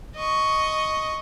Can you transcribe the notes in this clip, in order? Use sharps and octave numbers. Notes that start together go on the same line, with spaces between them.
D#5 C#6